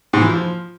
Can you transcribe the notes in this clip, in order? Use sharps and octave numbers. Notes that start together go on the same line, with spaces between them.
G#2
E3
F3